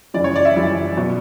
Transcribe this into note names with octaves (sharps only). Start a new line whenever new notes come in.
F#1 F#2 E3 G3 D5
C#5
D5
E5
F#1 F#2 E3 G3
B2 F#3